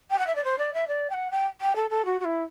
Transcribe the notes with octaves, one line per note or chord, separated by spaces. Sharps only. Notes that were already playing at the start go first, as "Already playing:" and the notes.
G5
F#5
E5
D5
C5
D5
E5
D5
G5
F#5
G5
G5
A4
A4
F#4
F#4
E4